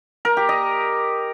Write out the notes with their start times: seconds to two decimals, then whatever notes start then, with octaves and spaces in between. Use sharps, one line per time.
0.25 A#4
0.37 G4
0.49 D#5